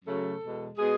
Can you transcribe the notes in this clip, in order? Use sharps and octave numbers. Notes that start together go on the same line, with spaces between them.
F#2 C#3 F#3 A3 A4
E2 B2 G#3
B2 G#3 G#4